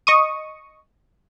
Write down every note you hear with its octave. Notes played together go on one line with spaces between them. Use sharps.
D#5 C#6 D#6